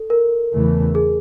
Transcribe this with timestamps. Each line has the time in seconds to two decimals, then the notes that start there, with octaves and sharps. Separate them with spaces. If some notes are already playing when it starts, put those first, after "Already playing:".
Already playing: A4
0.10 A#4
0.53 E2 C#3 E3 A3
0.95 G#4